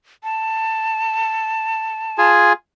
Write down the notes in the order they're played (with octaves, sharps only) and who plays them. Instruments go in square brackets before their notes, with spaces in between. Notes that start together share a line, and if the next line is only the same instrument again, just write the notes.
[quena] A5
[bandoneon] F4 G#4 G#5